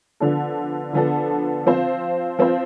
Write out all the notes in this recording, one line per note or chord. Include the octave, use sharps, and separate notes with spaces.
D3 F3 B3 D4 A4
D3 F3 B3 D4 A4
F3 C4 F4 C5
F3 C4 F4 C5